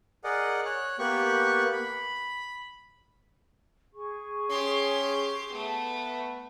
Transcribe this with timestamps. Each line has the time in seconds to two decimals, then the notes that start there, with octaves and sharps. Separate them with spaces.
0.24 G#4 A#4 D5 D#5 F#5
0.65 C#5 F#6
0.99 A#3 B3 G4 C#6 F#6
1.72 B5
3.93 G#4 C#6
4.50 C#4 G4 C6
5.52 A3 B3